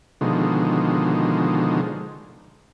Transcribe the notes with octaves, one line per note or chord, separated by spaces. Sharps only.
B2 D3 D#3 F3 G#3